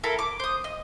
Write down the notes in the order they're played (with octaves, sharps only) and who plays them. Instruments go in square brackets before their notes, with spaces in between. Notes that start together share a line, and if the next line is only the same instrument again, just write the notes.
[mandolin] E4 A4 A#4 A5
D6
C5 D#6
D#5